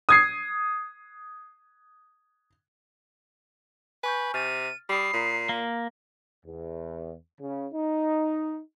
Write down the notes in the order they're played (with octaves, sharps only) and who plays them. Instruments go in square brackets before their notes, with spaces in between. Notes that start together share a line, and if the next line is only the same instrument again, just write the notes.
[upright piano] D#6 G#6 C7
[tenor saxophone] B4 [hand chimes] G#5 C#6 G6
[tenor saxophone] C3 [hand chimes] F6 A6 [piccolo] D#7
[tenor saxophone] G3 [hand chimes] B5 D#6 [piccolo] C7
[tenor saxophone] A#2 [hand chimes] A#5
[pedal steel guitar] A#3
[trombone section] E2
C#3
D#4